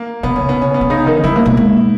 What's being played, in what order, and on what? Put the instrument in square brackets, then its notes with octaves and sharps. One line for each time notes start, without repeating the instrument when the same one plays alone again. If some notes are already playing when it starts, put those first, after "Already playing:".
Already playing: [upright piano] A#3
[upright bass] B2 [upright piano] B3
[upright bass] C#3 [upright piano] C#4
[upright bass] B2 [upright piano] B3
[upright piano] C#4
B3
[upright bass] B2
[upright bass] C#3 [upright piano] D#4
[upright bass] D#3
[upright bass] G3 [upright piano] E4
[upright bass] A#3
B2
G#3